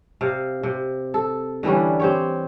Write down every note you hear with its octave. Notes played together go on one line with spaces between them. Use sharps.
C3 F5
C3
A4
D3 E3 G3 C#4
C4 G4 C#5